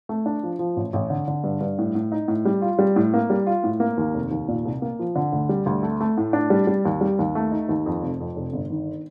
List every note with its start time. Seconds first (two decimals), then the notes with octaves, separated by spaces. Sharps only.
0.09 A3
0.26 D4
0.43 F3
0.59 F3
0.76 A1
0.93 A1
1.10 D3
1.28 D3
1.44 G2
1.60 G2
1.79 A2
1.95 A2
2.12 D#4
2.28 A2
2.45 G3
2.62 F4
2.79 G3
2.96 A2
3.14 A#3
3.30 G3
3.47 F4
3.64 A2
3.80 A#3
3.97 D#2
4.14 F1
4.31 D#2
4.48 A#2
4.65 C2
4.82 A#3
4.99 F3
5.16 D3
5.32 D2
5.49 G3
5.66 D2
5.83 A3
6.00 A3
6.17 A2
6.33 D4
6.50 G3
6.67 G3
6.85 D#2
7.01 G3
7.19 D#2
7.35 A3
7.52 D#4
7.69 D#2
7.86 F2
8.02 F1
8.20 F2
8.36 F1
8.53 G1
8.70 D#3